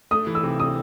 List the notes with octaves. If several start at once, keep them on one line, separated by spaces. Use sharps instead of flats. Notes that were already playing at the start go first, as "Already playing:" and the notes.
A3 D#6
E3
E6
C3
C3 D#6